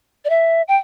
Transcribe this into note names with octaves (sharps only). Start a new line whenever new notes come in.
D5
E5
G5